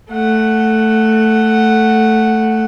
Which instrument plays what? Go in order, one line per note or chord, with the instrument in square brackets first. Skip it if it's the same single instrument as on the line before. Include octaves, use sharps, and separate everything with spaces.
[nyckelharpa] A3 F#5